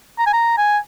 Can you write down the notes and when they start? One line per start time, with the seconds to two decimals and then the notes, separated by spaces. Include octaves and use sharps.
0.19 A#5
0.27 G#5
0.34 A#5
0.58 G#5